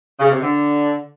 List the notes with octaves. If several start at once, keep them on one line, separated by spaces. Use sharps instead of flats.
C#3
C3
D3